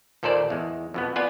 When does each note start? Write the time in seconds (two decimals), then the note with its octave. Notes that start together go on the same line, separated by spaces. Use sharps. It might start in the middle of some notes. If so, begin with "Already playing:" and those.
0.23 D#2 A#2 A4 A#4 C5 D5
0.50 E2 G#3
0.94 F2 B2 B3
1.16 B3 F4 B4 D5 G#5